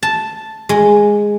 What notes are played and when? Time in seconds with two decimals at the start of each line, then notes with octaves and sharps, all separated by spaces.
0.03 A5
0.69 G#3